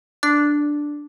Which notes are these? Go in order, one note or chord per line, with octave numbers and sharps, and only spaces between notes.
D4